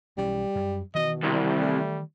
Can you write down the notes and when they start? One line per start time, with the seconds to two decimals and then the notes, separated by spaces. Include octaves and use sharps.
0.18 B1 E3 G3 C#4
0.55 F#2
0.95 B2 D#3 E3 D#5
1.24 C2 G3
1.60 A3